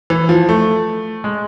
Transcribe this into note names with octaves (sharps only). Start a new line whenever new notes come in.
E3
F3
A3
G#3